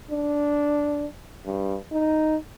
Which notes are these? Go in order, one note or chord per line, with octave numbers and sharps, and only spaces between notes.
D4
G2
D#4